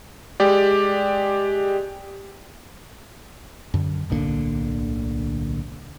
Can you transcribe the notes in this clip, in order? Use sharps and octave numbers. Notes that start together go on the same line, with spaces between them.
G#3 G4 D5
F#2 D3
D1 B1 D3 A#3